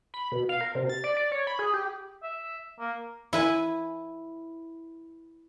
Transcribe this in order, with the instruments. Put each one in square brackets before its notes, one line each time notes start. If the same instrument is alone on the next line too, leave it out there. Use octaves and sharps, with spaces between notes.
[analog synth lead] B5
B2
F5
A#4
C3
A6
D5
D5
C#5
B5
G#4
G4
[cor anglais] E5
A#3
[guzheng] E4 B4 G#5